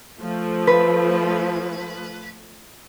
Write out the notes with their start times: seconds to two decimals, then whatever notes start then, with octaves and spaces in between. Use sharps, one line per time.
0.21 F3 A3
0.67 B4